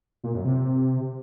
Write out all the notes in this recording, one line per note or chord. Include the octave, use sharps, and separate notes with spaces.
A#2
F#2
C3